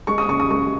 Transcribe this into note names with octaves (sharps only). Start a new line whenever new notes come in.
G#3 C#6
D#6
C#3 C#6
D#6
G#3 C#6